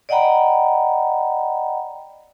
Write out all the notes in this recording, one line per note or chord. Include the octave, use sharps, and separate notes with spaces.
D5 D#5 F#5 G5 A#5 B5